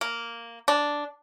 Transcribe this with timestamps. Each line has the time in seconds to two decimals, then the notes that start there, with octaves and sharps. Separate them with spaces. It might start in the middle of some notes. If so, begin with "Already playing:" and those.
0.01 A#3
0.68 D4